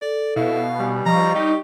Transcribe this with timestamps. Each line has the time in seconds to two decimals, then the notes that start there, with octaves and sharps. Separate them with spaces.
0.02 A4 D5
0.36 B2 E4 F5
0.80 G3 G#5
1.06 F3 D#5 A#5 C#6
1.35 D#4 G4